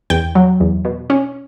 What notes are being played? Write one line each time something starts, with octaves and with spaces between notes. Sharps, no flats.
E2 G5
F#3
E2
B2
C#4